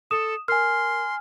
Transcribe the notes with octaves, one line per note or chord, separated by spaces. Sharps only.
A4 D#6 E7
A#4 G#5 C6 F6